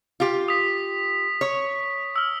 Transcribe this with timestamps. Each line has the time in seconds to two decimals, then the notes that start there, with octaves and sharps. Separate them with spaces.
0.20 F4 G4
0.48 D#6 B6
1.41 C#5
2.16 E6 F6